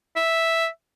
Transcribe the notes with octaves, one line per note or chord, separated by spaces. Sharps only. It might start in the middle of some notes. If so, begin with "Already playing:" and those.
E5